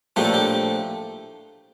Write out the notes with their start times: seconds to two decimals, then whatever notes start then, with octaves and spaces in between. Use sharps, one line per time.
0.16 A#1 A2 F3 A3 D4 G4
0.24 A4
0.34 G4